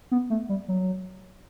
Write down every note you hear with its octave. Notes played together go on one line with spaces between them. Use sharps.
B3
A3
G3
F#3